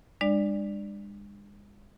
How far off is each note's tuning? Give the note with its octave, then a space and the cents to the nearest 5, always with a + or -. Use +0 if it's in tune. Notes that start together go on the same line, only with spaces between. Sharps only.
G#3 -40 D4 +30 D5 +0